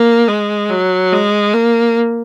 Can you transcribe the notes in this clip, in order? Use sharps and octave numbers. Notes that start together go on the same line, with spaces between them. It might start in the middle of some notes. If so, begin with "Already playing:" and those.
Already playing: A#3
G#3
F#3
G#3
A#3